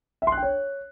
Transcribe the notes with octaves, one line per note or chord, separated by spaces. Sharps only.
E5
C6
F#6
G5
C#5